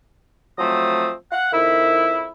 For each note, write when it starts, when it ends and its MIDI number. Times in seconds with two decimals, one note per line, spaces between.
0.58 1.11 53
0.58 1.11 54
0.58 1.11 57
0.58 1.11 60
0.58 1.11 87
1.32 1.51 77
1.32 1.51 78
1.53 2.27 41
1.53 2.27 51
1.53 2.27 64